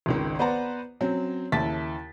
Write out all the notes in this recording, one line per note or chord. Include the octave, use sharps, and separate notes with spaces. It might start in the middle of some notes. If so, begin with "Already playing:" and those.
G#1 C#2 D#3
B3 B4 C5 D5 F#5 A#5
F#3 C4 C#4
D#2 C#3 E4 A5 A6 B6